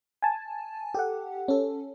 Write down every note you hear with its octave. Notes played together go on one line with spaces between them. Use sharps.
G#5 A5
G4 A4 F#5
C#4 A4